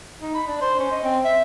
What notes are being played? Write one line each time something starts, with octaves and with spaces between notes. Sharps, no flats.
D#4
B5
D4
C5
C#4
D#5
C4
E5